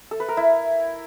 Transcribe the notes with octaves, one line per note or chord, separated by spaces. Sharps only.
A4
B4
A#4
E4